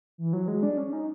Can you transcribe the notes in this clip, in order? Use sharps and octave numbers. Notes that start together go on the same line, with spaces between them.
E3
F#3
G#3
D4
C#4
D#4